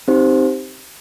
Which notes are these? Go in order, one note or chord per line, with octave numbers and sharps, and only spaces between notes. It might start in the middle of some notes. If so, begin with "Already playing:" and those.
C4 D#4 G4 C5